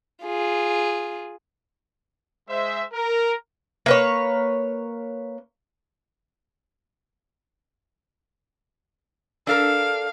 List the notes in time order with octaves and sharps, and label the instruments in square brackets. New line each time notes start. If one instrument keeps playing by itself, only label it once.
[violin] F4 G#4
[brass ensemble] G#3 C5 E5
A#4
[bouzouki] A#3 B4 C#5
[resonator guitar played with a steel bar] D4 A4 A#4 [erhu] F5